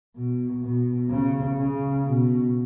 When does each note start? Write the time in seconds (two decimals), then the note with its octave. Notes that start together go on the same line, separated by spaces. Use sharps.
0.16 B2
0.63 B2
1.10 C#3
1.58 C#3
2.05 B2